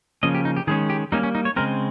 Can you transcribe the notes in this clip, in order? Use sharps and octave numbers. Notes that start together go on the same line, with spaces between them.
C#3 F3 A#3 C#4 D#5
G4
D#4
G4
D#3 G#3 C#4 G#4
G4
G3 A#3 C#4 D#4
C#4
D#4
C#5
C#3 G#3 C4 A#4